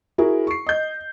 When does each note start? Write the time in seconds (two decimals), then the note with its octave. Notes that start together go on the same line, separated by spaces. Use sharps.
0.18 E4 F#4 G#4 A#4
0.47 C#6 C7
0.66 D#5 G6